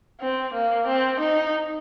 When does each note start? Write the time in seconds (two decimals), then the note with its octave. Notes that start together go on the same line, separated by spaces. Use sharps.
0.20 C4
0.54 A#3
0.87 C4
1.20 D#4